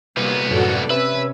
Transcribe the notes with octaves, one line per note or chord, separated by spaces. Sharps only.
C2 G3 A#3 B3
F#2 A2 F#3 F#4 A4 D5
C3 C#4 B4 E5 E6